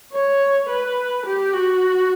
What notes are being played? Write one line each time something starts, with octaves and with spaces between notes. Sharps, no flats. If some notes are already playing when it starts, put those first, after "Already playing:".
C#5
B4
G4
F#4